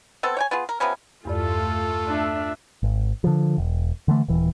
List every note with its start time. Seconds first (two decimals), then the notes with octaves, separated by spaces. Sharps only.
0.23 B3 C4 A4
0.37 C#5 G5 G#5
0.51 B3 F4 G#4
0.69 A#4
0.80 C3 F3 B3 C#4
1.25 E2 G2 A3 F4 A4 D5
2.07 D4 E5
2.83 G#1
3.24 D3 F3
3.58 E1
4.08 D3 E3 A3
4.28 D#1 E3